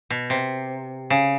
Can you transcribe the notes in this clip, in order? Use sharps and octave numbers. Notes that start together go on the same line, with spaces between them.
B2
C3
C#3